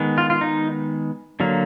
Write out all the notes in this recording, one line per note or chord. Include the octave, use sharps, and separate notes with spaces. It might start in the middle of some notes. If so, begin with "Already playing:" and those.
Already playing: D#3 G#3 B3
F4
F4
D#4
D3 F#3 A#3